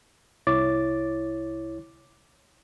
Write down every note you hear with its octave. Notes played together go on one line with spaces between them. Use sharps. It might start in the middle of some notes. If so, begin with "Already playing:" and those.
C2 E4 C#5 D6 A6